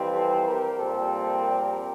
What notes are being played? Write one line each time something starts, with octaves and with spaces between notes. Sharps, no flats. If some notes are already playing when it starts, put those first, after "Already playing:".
Already playing: F2 E3 G3 C4
A4 C5
G4 A#4
A#1 A#2 G3 C4 A4 C5
G4 A#4